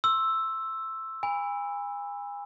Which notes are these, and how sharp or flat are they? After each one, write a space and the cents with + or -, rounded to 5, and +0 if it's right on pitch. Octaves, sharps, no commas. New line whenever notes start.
C6 +30 E6 +0
G#5 -35 B5 +0